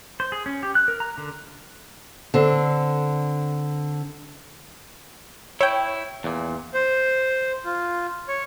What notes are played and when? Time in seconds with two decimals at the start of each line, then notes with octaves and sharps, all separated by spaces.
0.20 C5
0.32 G#4
0.46 C#4
0.63 G4
0.75 F#6
0.88 A#4
1.00 A#5
1.18 D3
2.34 D3 C4 D4
5.61 E4 C#5 G5
6.24 E2 A#2
6.74 C5
7.65 F4
8.28 C#5